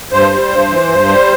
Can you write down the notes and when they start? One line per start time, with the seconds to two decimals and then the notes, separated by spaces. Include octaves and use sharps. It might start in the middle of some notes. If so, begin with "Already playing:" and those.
0.11 G2 C5
0.31 G3
0.50 G2
0.69 E3
0.90 G2
1.09 G3